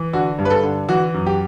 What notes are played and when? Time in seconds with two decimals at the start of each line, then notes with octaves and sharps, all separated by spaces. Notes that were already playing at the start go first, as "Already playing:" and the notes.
Already playing: E3
0.13 D3 F#4
0.39 G2
0.45 B4
0.50 A4
0.63 D3
0.89 E3 F#4
1.14 F#2
1.27 G4